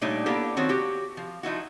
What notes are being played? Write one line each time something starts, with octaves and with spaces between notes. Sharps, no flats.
A#2 G3 A3 D4 D#4 C#5
A#3 B3 D4 E4 G4 A4
D#3 F3 C4 F#4 C#5
F#4 G4
F3
F3 D#4 E4 F#4